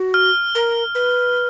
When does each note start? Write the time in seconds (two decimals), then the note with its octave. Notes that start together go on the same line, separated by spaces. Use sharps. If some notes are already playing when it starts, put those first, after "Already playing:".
Already playing: F#4
0.14 F6
0.55 A#4
0.95 B4